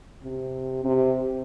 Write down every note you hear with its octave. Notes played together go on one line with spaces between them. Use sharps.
C3
C3